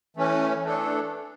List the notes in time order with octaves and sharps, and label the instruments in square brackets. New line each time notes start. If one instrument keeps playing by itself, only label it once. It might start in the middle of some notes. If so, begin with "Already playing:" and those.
[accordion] E3 A3 C#4
E3 A3 D4 A4